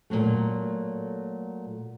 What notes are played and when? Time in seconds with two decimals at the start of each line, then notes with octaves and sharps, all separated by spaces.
0.10 A#2 E3 F#3 A3